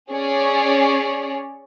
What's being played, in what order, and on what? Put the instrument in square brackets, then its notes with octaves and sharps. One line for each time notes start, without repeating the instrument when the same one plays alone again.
[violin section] C#4 G#4 C#5 D5